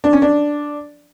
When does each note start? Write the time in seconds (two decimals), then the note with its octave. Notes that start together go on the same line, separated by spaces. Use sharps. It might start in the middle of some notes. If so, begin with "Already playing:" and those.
0.04 D4
0.13 C#4
0.22 D4